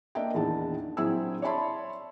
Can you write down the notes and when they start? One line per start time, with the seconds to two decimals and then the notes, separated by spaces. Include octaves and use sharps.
0.15 A#3 D4 A#4 D#5 E5 G5
0.34 A#1 E2 D#3 A5
0.97 A#1 F#3 C4 E4 G#4 E6
1.42 C#5 D5 E5 A5 B5 C6